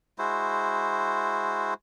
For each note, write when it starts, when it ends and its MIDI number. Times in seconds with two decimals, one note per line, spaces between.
0.19 1.74 56
0.19 1.74 64
0.19 1.74 66
0.19 1.74 72